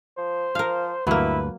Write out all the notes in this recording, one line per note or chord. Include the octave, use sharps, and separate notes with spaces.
F3 C5
F3 A#4 F5
D2 G2 F#3 A#3 E4 B4